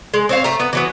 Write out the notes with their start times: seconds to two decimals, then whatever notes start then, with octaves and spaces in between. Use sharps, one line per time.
0.14 G#3
0.29 C4 C#5 F5
0.44 A3 A#5
0.60 B3
0.73 E3 F#3 B3